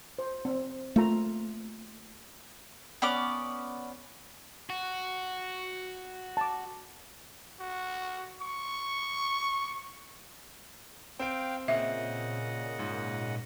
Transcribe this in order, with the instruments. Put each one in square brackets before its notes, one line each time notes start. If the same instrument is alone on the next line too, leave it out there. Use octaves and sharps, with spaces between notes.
[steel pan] C5
C4
[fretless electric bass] A3 [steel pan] A#3 F4 A#5
[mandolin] B3 C#4 D5 D6
[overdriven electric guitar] F#4
[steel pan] A5 D6
[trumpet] F#4
C#6
[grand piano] C4 D7 [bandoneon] F5 G5
[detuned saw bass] A#2 [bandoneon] C#3 D#5 F#5 [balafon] E5
[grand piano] G#2